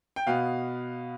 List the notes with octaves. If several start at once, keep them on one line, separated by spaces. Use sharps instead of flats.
G5
B2 B3 F5